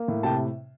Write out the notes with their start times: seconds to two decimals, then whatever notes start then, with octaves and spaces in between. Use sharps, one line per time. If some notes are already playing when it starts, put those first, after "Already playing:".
Already playing: A#3
0.08 A2
0.23 C3 G5 A5